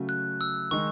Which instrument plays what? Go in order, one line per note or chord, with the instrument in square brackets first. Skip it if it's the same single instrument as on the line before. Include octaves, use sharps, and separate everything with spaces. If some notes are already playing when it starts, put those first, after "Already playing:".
Already playing: [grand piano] C#3 F#3 A3 C#4 F#4
[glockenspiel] F#6
E6
[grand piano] D#3 G#3 D#4 [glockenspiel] C#6